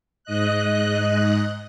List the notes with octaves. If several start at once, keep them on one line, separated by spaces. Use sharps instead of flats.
G#2 D#5 F#6